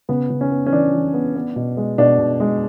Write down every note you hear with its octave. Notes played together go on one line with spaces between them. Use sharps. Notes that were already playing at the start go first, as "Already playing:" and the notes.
C#3 B3
C#3
C#4
B3
C#4
E3 D4
E3
B3
B3
B2
G#3
B2 D4
B2
G#3